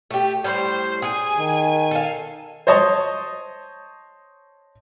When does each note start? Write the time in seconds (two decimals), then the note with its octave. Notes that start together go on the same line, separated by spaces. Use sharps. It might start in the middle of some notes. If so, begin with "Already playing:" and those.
0.11 A3 G4
0.44 A2 G3 C5
1.02 G#4 G#5
1.38 D#3
1.91 A4 F5
2.67 C5 C#5 D#5 A5 C#6 D#6